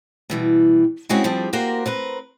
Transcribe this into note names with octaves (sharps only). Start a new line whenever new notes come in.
B2 E3 G3
G#3 C4 C#4 E4 F#4 G4
F3 G3 C4 D4 G4 G#4
A#3 F#4 G4 A#4 C5
C4 A#4 B4